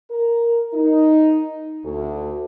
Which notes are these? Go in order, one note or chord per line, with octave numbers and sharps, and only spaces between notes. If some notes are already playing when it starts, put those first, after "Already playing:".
A#4
D#4
D2